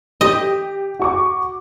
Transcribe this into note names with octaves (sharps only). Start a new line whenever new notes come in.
G4 D#5
F#4 C#6 D6